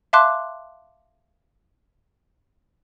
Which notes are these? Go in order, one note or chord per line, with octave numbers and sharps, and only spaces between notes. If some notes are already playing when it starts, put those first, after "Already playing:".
E5 F5 A5 C6 D6 F#6